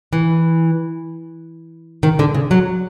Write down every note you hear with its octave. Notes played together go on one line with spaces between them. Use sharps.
E3
D#3
D3
C#3
F#3